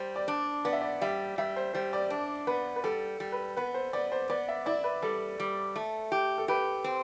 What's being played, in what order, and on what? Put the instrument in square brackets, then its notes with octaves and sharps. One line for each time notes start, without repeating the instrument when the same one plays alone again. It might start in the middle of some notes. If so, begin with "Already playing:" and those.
Already playing: [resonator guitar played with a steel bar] G3 [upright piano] C5
[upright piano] D5
[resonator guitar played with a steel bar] D4
[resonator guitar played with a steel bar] B3 [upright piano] D5
[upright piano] E5
D5
[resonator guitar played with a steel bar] G3 [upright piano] E5
[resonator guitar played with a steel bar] G3 [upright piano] E5
[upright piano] C5
[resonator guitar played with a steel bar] G3 [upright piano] C5
[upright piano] D5
[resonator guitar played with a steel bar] D4
[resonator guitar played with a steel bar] B3 [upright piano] B4
[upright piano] B4
[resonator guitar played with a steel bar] G3 [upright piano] A4
[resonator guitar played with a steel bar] G3
[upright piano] B4
[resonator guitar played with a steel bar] B3 [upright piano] B4
[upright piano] C5
[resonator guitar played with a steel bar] B3 [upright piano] D5
[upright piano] C5
[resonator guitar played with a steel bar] B3 [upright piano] D5
[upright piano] E5
[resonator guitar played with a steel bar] E4 [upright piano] D5
[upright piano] B4
[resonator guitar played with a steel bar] G3 [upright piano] A4
[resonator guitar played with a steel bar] G3
A3
G4
[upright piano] A4
[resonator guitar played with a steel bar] G4 [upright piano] B4
[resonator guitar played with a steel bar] C4